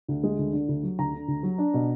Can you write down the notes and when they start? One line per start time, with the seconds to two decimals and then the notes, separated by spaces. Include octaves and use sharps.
0.08 D2
0.23 G#3
0.39 D2
0.53 D3
0.68 D2
0.83 F#3
0.99 D2 A#5
1.14 D3
1.28 D2
1.43 F#3
1.58 D4
1.74 B2